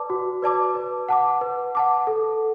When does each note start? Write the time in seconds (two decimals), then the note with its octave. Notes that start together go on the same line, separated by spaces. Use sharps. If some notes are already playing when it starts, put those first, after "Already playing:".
Already playing: B4 D5 A5 D6
0.10 F#4
0.42 B4 D5 A5 D6
0.75 B4
1.09 F#5 A5 D6
1.41 B4
1.75 F#5 A5 D6
2.07 A4